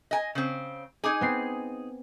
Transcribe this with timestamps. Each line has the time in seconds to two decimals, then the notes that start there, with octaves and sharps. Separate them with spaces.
0.11 D#5 G#5
0.35 C#3 C4
1.04 D#4 G#4 G#5 D6
1.21 B3 C4 C7